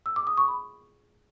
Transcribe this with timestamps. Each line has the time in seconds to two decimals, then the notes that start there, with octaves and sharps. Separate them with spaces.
0.06 E6
0.16 D6
0.27 D#6
0.37 C#6
0.48 B5